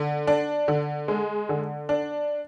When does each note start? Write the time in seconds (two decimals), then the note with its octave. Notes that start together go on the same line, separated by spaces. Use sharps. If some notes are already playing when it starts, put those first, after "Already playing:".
Already playing: D3
0.27 D4
0.68 D3
1.08 G#3
1.49 D3
1.89 D4